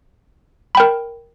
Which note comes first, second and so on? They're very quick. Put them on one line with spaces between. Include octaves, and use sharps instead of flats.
B5 G5 A#4